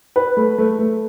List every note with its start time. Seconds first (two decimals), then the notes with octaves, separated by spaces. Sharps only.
0.16 B4
0.37 A3
0.58 A3
0.79 A3